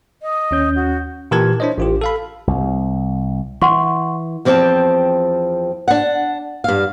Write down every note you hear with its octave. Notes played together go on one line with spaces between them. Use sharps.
D#5
D#2 C#4 G6
F#4
A#2 E3 G4 A#4 A5 G#6
D4 E4 C5 C#5 D#5
A1 F4 G4
A4 F5 B5
C2
E3 F#5 C6 C#6
E2 F3 C4 C#5 G5 A5
D4 F#5
G2 F5